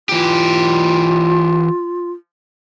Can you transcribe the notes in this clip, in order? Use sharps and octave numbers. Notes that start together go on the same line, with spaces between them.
E3 F4 G4